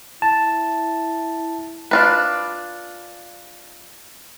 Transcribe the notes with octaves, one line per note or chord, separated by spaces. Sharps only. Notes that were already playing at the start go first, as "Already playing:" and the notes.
E4 A5
D4 F4 B4